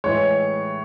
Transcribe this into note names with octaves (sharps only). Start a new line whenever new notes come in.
A2 E3 G#3 C#5